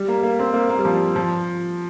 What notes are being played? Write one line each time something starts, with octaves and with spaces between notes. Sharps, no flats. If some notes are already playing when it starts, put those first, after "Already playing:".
Already playing: G3
A#3
A#3
C4
A#3
A#3
G3
F3
F3